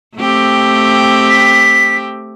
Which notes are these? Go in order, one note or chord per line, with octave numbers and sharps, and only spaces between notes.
A3 C4 G4
B6